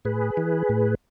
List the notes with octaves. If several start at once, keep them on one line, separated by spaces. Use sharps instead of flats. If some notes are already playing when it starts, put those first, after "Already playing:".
A2 G#4 B4
E3
A2